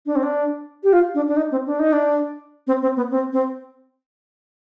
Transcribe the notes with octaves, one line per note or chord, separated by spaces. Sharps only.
D4
C4
D4
G4
F4
D4
D4
D#4
C4
D4
D#4
D4
C4
C4
B3
C4
C4